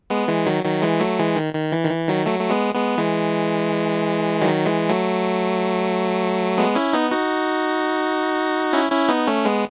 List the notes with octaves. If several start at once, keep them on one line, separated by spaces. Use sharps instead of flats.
G#3 B3
E3 G#3
D#3 F#3
D#3 F#3
E3 G#3
F#3 A3
E3 G#3
D#3
D#3
E3
D#3
E3
D#3 F#3
F#3 A3
A3
G#3 B3
G#3 B3
E3 G#3
D#3 F#3
E3 G#3
F#3 A3
G#3 B3
C#4 E4
B3 D#4
D#4 F#4
C#4 E4
C#4 E4
B3 D#4
A3 C#4
G#3 B3